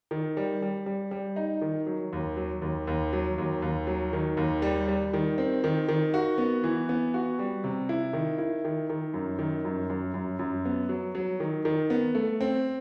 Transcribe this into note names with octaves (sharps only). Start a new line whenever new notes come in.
D#3
G3
G3
G3
G3
D#4
D#3
F#3
D#2
F#3
D#2
D#2
F#3
D#2
D#2
F#3
D#3
D#2
G3
G3
D#3
C4
D#3
D#3
F#4
B3
E3
B3
F#4
G3
C3
E4
D#3
E4
D#3
D#3
F#2
D#3
F#2
F#2
F#2
F#2
B3
F#3
F#3
D#3
D#3
B3
A3
C4